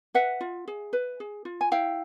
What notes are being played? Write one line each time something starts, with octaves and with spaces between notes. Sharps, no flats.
B4 E5 F#5
F4
G#4
B4
G#4
F4
G#5
E4 F5 G5